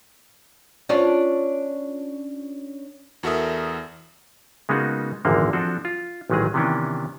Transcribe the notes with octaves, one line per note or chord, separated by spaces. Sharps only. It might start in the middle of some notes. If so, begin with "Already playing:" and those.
C#4 D4 F4
E2 F#4 A4 A#4 E5 D#6
C#3 G#3 A#3 B3 D#4 F#4
G#1 E2 A#2 D3 F3 A#3
F3 C4 D4 F#4 A4
F4
A1 A#2 D#3 F#3 G#3 G#4
C3 D#3 E3 B3 C#4 D4